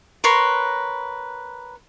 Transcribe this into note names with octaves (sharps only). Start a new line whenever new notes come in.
A#4 B4 C#5 C6